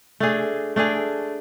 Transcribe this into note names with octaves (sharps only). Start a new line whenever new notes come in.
A3 D4 G#4
A3 D4 G#4